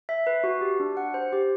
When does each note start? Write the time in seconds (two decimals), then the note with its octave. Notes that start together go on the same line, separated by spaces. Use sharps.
0.09 E5
0.27 B4
0.44 F#4
0.61 G4
0.80 D4
0.97 F#5
1.14 C5
1.33 G4